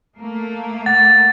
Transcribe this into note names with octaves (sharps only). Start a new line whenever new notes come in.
A3 A#3
F#5 A6